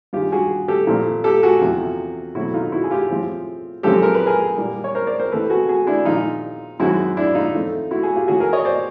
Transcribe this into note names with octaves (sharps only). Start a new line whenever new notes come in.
G2 D#3 G#3 F4 G4
F#4 G#4
G4 A4
A#2 F3 A3 C4
G4 A4
F#4 G#4
E2 C3 F3 A3
B2 F#3 A3 C4 E4 F#4
D#4 F4
E4 F#4
G#4
F4 G4
A2 F3 G#3 C4
F#2 C#3 F3 G#3 C4 G4 A4
A#4
B4
G#4 A#4
A#2 G3 A#3
C#5
A#4 C5
C5 D5
A#4 C5
C3 E3 A3 C4 A4 B4
F#4 G#4
F#4 G#4
D4 E4
A#2 F3 G#3 D#4 F4
F#2 D#3 G#3 C4 E4 F#4
D4 E4
D#4 F4
A2 F3 A3 C4
E4 F#4
F#4 G#4
F4 G4
C#3 E3 A3 F#4 G#4
G#4 A#4
C#5 D#5
C5 D5